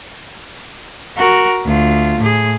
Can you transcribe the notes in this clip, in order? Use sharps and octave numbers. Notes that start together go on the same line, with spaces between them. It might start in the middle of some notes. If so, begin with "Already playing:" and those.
F#4 A#4
D2 F4
A2 G#4